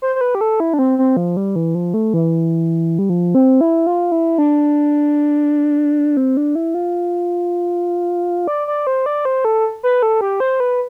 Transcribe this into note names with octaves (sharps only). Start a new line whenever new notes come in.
C5
C5
B4
G4
A4
E4
D4
C4
C4
F3
G3
E3
F3
A3
E3
G3
F3
C4
E4
F4
E4
D4
C4
D4
E4
F4
D5
D5
C5
D5
C5
A4
B4
A4
G4
C5
B4